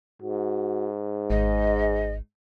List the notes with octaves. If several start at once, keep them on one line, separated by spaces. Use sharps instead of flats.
G#2 F#4
G#1 G#3 D#5